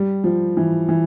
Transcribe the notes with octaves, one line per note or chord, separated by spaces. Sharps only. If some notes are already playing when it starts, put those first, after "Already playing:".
Already playing: G3
F3
E3
E3